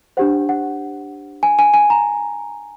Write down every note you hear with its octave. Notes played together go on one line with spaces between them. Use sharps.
D4 G4 C5 F#5
F#5
G#5
G#5
G#5
A#5